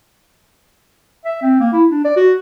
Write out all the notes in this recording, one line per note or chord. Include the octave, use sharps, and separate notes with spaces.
E5
C4
A#3
E4
D4
D5
F#4